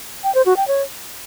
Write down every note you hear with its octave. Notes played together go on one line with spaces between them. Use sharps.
G5
C5
F#4
G5
C#5